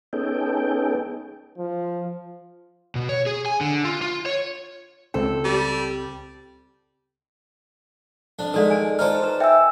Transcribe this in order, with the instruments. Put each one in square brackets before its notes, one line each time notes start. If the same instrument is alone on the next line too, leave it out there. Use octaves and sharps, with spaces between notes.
[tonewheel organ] B3 C#4 D#4 G#4 A4 G5
[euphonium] F3
[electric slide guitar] B2
C#5
G#4
G#5
D3
F4
F4
C#5
[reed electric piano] C#2 C4 G5 [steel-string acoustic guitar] A4
[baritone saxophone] G3
[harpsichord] F2 D4
[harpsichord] D#3 G#3 [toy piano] A4 D5 F5
[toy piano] G#5 A5
[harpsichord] D#4 F4 A4 [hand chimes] C5 D5 F6
[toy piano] B4 A#5
[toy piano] E5 [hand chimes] G5 G#5 E6